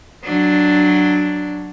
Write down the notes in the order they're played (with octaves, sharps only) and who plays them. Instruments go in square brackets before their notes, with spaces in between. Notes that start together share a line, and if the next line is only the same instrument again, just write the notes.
[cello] F#3 D4